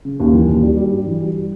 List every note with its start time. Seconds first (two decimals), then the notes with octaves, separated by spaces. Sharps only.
0.05 C#3
0.20 D#2
0.34 E3
0.48 D#2
0.63 G3
0.77 G3
0.91 G2
1.06 E3
1.21 G3